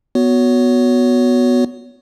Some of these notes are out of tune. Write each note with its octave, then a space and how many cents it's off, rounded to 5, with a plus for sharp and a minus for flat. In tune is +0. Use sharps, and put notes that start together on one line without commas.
B3 +0 F#4 +0 C#5 +20